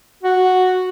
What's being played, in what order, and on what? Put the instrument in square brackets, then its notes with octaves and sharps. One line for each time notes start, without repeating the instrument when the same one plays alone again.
[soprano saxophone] F#4